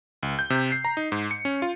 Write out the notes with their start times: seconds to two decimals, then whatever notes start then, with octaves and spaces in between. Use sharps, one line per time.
0.23 C#2
0.39 G6
0.50 C3
0.72 C7
0.85 A#5
0.97 D#4
1.12 G#2
1.31 C#7
1.45 C#4
1.62 F4